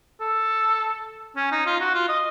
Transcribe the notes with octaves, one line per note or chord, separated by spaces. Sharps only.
A4
C#4
D#4
F4
F#4
F4
D#5